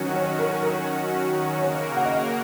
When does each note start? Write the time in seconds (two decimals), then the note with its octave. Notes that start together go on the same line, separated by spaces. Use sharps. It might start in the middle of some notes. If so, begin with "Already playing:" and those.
Already playing: D#3 F#3 C#4 F#4
0.16 C#5
0.39 A#4
0.62 A#4
1.58 C#3 A#3 F#4 A#4 C#5
1.97 F#5
2.05 D#5